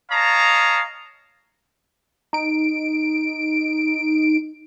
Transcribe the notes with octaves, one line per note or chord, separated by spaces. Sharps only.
C#5 D#5 F5 A5 A#5
D#4 D7